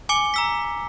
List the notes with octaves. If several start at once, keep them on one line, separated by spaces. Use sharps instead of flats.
G#5 D6 C#7 G7
A#5 E6 B6